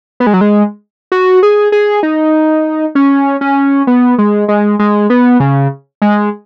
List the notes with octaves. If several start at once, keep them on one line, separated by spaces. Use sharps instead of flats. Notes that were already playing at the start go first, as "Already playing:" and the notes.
B3
G#3
F#3
G#3
F#4
G#4
G#4
D#4
C#4
C#4
B3
G#3
G#3
G#3
B3
C#3
G#3